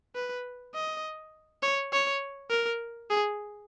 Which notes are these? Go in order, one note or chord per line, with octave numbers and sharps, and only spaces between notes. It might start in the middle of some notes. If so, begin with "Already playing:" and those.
B4
D#5
C#5
C#5
A#4
G#4